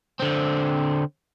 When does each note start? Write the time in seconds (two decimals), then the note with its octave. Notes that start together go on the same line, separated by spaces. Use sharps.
0.20 D3 C4